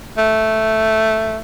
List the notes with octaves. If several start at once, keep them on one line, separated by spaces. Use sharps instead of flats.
A3